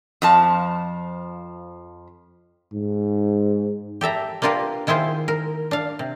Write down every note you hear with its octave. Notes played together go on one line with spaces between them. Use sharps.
F2 F3 A5
G#2
G4 A4 E5 A#5
A#3 D4 F4 G4 A#4 B4
D#3 E4 F4 G#4 C5
A#4
D4 F5
C3